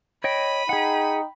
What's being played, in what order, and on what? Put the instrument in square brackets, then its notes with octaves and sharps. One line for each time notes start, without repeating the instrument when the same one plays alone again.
[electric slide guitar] C#5 D#5 G5 [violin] B5 D#7
[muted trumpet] D#4 [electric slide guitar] G#4 F#5 [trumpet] G5